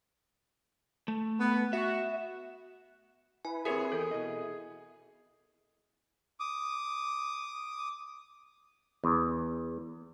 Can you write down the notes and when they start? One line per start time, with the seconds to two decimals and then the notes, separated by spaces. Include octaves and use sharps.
1.08 A3
1.39 B3
1.73 F#4 E5
3.45 E4 B4 G#5
3.65 C4 G4 G#4 A#4 C#5 E5
3.92 E2 A4 D#5 G5
4.11 B2 E4 D#5
6.40 D6 D#6
9.04 E2